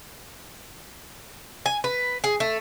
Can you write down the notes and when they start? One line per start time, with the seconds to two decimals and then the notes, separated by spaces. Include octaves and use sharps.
1.66 G#5
1.84 B4
2.24 G#4
2.40 A3